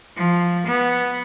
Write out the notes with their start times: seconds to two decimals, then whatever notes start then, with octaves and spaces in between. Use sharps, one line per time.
0.17 F3
0.67 B3